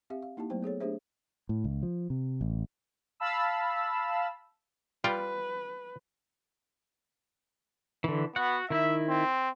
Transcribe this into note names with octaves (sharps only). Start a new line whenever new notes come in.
C4 G4 E5 F5
F5
A#3 D#4 E4 G4 A5
F#3 A3 B3 C5 G5
B3 G#4 A4 C#5
A3 D4 G4 G#4 C5 E5
A2
C#2
F3
C3
A1
F5 A5 B5 E6
G3 F4 B4 G5
D3 E3
B3 F#4 F#5
D#3 E4 E5
C4